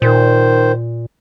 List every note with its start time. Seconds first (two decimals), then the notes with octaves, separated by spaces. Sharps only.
0.02 A#2 D#3 C5